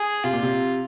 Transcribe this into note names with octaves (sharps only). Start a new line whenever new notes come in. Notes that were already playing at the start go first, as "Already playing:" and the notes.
Already playing: G#4
C3 F4
A#2
C3